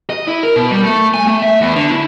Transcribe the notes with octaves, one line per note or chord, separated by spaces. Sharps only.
D#5
E4
A#4
B2
G3
A3
G#5
A3
E5
E2
D3
E4